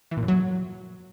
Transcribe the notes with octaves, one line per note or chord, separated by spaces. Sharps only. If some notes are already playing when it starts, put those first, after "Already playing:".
E3
A#2
F#2
F#3